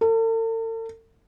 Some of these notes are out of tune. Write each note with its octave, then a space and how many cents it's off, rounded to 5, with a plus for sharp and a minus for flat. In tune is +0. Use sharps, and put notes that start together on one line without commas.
A4 +45